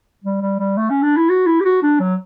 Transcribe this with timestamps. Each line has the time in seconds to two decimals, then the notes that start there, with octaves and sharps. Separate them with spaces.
0.24 G3
0.41 G3
0.59 G3
0.77 A3
0.90 C#4
1.03 D4
1.17 E4
1.29 F#4
1.46 E4
1.60 G4
1.65 F#4
1.82 D4
2.00 F#3